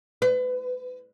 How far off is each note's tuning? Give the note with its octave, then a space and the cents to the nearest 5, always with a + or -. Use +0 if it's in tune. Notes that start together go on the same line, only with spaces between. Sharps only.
B4 +30